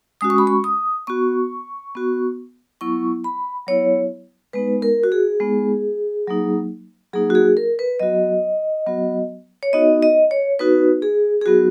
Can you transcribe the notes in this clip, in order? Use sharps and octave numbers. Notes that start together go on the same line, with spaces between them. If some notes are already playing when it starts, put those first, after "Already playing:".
G#3 C#4 F#4 D#6
C#6
B5
C#6
D#6
B3 F#4 C#6
B3 F#4
F#3 B3 E4 C#6
B5
F#3 B3 E4 C#5
G#3 B3 D#4 B4
A#4
F#4
G#4
G#3 B3 D#4
F#3 A#3 D#4
F#3 A#3 D#4 G#4
F#4
G#4
A#4
B4
F#3 B3 F#4 D#5
F#3 B3 F#4
C#5
B3 D#4 F#4 D#5
D#5
C#5
B3 D#4 F#4 B4
G#4
G#4
F#3 B3 D#4 F#4